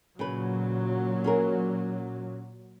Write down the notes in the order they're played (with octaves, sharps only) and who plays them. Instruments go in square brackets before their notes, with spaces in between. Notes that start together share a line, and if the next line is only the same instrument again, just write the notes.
[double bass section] A#2 F#3 [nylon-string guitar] C#3 B4
[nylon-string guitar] C#4 G#4 A#4